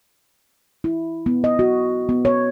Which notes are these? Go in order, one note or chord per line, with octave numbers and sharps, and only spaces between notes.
E4
B3
D#5
F#4
B3
C#5